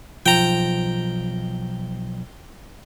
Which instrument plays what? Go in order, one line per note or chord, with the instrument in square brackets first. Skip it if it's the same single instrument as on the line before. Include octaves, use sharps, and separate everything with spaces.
[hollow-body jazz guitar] B1 F3 [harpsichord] G5 A#5